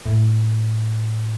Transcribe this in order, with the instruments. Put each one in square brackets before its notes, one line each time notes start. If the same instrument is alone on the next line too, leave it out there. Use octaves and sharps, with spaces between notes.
[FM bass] A2